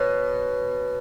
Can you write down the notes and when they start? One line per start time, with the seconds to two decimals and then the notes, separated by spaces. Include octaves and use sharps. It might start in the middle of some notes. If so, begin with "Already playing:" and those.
Already playing: B2 C#5